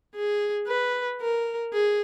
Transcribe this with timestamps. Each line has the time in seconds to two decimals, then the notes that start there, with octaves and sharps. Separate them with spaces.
0.15 G#4
0.68 B4
1.20 A#4
1.73 G#4